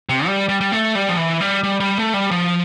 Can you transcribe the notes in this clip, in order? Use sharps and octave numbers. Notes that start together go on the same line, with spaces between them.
C3
G3
G3
G3
A3
G3
F3
E3
G3
G3
G3
A3
G3
F3